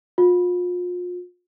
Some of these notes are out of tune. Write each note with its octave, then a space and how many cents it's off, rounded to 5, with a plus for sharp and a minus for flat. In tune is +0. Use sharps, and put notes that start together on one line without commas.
F4 +35